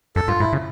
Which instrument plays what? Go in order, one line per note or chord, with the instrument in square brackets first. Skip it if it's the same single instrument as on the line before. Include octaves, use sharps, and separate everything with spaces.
[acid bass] F#2 [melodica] A4
[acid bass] G2 [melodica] F4
[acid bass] G#2 [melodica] E4
[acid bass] C#3